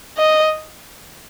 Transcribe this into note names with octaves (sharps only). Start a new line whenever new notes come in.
D#5